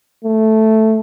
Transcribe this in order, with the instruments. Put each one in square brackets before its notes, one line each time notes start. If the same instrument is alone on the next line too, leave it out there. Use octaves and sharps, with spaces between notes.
[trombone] A3